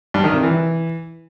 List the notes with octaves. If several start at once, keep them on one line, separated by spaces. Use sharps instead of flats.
G2
D#3
C3
E3